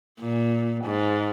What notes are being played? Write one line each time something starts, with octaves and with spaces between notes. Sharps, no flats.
A#2
G#2